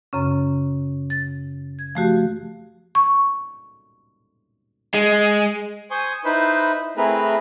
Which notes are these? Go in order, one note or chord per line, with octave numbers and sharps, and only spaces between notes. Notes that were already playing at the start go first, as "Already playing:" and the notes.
F#2 C#3 C#4
A6
G#6
F3 A3 F#4 G4
C#6
G#3
C5 G#5 C6 C#6 D#6
D#4 E4 B4 C5
A3 C4 E4 G#4 A#4 B4